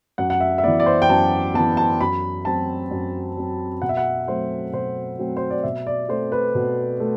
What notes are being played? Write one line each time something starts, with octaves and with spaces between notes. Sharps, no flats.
F#2 F#5
F#5
E5
E5
E3 B3 D5
D5
C5
G5
F#2 A5
E3 B3 A5
A5
F#2 B5
F#3 C4 A5
F#2
F#3 C4
B2 F#5
E5
F#5
F#3 A3 C4 C5
B2 C5
F#3 A3 C4
C5
D5
B2 E5
D5
A3 C4 C5
B4
B2
A3